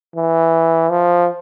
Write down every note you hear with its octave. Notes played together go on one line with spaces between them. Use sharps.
E3
F3